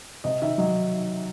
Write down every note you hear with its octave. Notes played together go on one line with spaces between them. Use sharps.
C3 D#5
D#3 E5
F#3 D#5